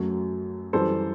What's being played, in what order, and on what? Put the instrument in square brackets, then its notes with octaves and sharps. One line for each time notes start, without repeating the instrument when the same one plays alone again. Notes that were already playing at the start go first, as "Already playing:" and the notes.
Already playing: [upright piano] F#2 F#3 A3
F#2 E3 G3 A4 C5